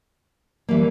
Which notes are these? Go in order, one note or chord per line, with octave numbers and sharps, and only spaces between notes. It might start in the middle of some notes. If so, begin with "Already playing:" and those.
E3 G3 A#3